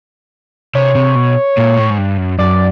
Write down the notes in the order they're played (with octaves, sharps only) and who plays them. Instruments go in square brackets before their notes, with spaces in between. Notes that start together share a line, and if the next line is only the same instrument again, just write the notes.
[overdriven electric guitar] C3 [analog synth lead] C#5
[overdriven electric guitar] C3
B2
A#2
A2
G#2
G2
F#2
[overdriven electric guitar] F#2 [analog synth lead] D5